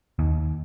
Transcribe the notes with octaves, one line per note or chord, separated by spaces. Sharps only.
D#2